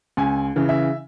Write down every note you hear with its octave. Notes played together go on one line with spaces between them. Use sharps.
C#2 G#5
C#3 E3
E5